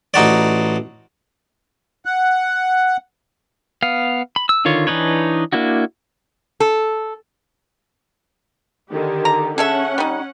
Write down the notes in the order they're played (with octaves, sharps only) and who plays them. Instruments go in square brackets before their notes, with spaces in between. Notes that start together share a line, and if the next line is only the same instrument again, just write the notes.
[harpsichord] A1 D#4 F#4 D5
[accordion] F#5
[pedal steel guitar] B3 F5
B5
E6
D3 D#3 F4 C#5
E3 D4 D#4 B4 C#5
A#3 D4 E4 F#4
[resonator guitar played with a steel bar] A4
[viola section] D3 D#3 G4
[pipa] A#5
[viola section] C#4 F#5 [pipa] G#4 A4 E5
[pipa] G3 D#4